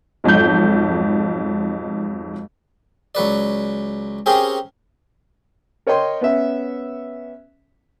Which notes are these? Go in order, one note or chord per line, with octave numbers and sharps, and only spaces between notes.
B1 F2 G#2 G6
C#2 F#3 B4 D5
C4 C#4 G4 G#4 A#4
A#4 C#5 D#5 G5 C6
B3 C#4 E5